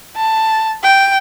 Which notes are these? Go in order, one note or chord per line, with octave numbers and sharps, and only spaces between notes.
A5
G5